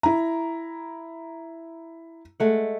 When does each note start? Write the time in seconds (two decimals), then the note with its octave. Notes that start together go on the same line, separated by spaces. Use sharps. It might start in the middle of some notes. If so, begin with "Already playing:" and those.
0.03 E4 A#5
2.40 G#3 A3 F#5